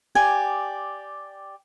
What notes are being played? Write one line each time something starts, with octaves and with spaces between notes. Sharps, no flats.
G4 D5 G#5